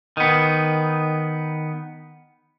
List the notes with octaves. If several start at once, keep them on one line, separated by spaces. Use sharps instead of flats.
D#3 B3